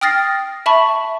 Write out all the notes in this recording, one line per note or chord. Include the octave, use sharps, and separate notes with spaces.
G5 D#6 F6 A6 A#6 C7
E5 A5 B5 C#6